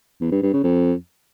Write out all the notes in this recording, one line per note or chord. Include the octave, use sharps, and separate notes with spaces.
E2
G2
G2
C#3
F2